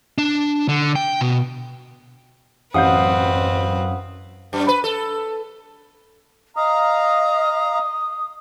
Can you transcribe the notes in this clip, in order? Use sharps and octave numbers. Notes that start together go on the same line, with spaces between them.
D4
D3
G5
B2
A1 F#2 C4 B4 F5 F#5 D#6 G6
F#2
B4
A4
D#5 F5 A#5 D#6